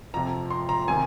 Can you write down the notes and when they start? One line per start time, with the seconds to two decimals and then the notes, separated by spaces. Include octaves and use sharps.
0.14 F2 C3 F3 A#5
0.50 C6
0.69 A#5
0.88 C3 D#3 G#5